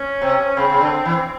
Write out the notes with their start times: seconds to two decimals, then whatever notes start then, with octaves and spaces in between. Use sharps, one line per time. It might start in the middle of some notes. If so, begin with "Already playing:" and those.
Already playing: C#4
0.22 C3
0.57 C#3 C4
0.70 C#3
0.81 D3
1.05 E3